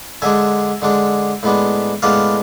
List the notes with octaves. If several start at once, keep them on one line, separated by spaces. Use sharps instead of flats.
D3 G#3 D4 E5 G#5
D3 G#3 D4
A2 G#3 B3 D4
A2 G#3 B3 D4 D5 F5